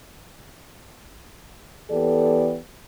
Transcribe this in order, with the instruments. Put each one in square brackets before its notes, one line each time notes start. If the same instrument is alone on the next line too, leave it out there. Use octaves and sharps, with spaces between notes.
[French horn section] E3 B3 G4 A4 D5